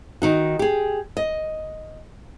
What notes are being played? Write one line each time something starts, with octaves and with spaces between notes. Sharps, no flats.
D#3 D#4 F#4
G4 G#4
D#5